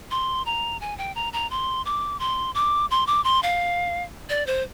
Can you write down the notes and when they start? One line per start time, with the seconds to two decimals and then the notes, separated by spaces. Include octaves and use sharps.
0.11 C6
0.46 A#5
0.81 G#5
0.98 G5
1.15 A#5
1.33 A#5
1.51 C6
1.86 D6
2.20 C6
2.55 D6
2.91 C6
3.07 D6
3.24 C6
3.43 F5
4.29 D5
4.47 C5